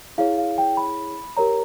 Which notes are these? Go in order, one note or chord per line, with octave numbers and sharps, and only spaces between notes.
E4 G#4 C#5 F5
F5
G5
B5
G4 A#4 C#5 A#5